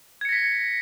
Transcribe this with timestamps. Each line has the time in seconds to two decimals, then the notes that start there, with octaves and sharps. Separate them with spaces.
0.21 G#6
0.25 C#7
0.29 A#6
0.32 B6